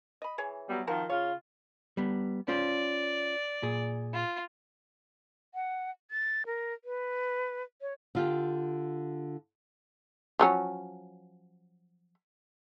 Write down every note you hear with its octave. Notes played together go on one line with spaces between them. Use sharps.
D#5 B5
E3 G#4 C#5
F#3 G3 B3
D#3 F3 C4 F4 F#4 A#4
C#3 F4 C#5
G3 B3
C#4 F4 C5 D5
A#2 G#4
F4
F#5
A6
A#4
B4
C#5
D3 F4 G4
F3 F#3 C#4